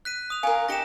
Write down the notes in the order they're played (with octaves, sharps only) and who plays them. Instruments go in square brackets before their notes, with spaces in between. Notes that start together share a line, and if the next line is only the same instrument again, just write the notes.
[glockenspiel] F#6 B6 D#7
D#6 F7
[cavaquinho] A#4 C#5 [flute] F5 [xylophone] G#5
[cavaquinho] D#4 G4 [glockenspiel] A#6 C#7 E7